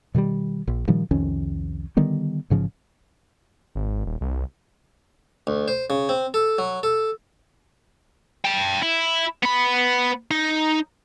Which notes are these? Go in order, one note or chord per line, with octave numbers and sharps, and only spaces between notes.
B2 D#3 E3 G3
A#1
A#2 D#3 F3 G3
C2 F2 D#3 C#4
D3 D#3 G3 B3
A1 G#2 C#3 F3
G#1
D#1
C2
D2
C5
C#3
C4
A4
F#3
A4
G5 A5
E4
B3 B5
D#4